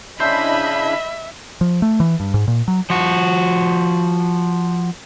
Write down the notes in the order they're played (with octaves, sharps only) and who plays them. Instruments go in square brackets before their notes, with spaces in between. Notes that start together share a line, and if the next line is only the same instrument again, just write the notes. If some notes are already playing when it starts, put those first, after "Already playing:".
[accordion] C#3 D4 E4 [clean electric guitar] C5 [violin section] D#5 B5 [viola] E5
[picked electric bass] F3
A3
E3
G2
G#2
A#2
F#3
[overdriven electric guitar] F3 F#4